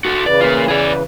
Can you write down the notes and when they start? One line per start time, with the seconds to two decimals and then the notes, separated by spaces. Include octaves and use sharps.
0.05 F#4 A4
0.26 C#3 E3 B4 D5
0.41 A#3 F4
0.68 G#4 D5